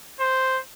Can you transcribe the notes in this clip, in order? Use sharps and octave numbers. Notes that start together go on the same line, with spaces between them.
C5